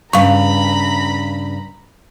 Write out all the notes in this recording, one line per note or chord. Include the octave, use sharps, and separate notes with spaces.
G2 C#3 F5 A#5 B5 C#6